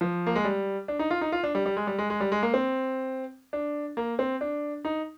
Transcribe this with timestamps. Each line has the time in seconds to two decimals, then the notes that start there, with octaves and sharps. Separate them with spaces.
0.01 F3
0.27 A#3
0.36 G#3
0.44 G3
0.88 D4
0.99 D#4
1.10 F4
1.21 D#4
1.32 F4
1.44 D4
1.55 G3
1.66 G3
1.77 G#3
1.87 G3
1.98 G#3
2.10 G#3
2.20 G3
2.32 G#3
2.43 A#3
2.54 C4
3.53 D4
3.97 A#3
4.19 C4
4.41 D4
4.85 D#4